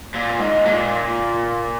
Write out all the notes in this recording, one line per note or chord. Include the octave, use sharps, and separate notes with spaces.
A#2
G#2
A#2